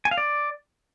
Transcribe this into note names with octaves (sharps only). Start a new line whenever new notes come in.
G#5
F5
D5